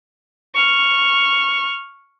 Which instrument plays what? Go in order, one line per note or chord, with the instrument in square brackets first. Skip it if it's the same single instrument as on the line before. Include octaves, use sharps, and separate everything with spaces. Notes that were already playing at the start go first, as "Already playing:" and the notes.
[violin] C#6 F6